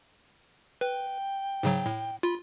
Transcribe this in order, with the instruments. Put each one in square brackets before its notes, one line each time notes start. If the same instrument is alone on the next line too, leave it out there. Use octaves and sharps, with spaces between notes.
[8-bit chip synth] B4 [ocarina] G5
[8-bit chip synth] G#2 C#3 F#3
A2
[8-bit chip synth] F4 [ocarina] B5